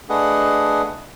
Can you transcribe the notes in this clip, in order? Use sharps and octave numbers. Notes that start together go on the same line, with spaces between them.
A3 D4 G#4 B4 D#5 F#5